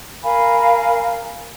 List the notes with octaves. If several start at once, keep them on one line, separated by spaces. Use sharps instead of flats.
A#4 F5 G#5 B5